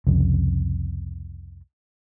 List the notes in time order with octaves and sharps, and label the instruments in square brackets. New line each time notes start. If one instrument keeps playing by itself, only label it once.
[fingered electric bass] C2 F2 C#3